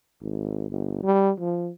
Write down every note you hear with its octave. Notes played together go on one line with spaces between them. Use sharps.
G#1
G1
G3
F3